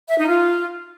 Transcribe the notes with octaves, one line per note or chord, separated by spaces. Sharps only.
E5
D#4
F4